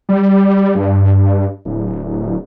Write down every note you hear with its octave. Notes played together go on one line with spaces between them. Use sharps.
G3
G2
D1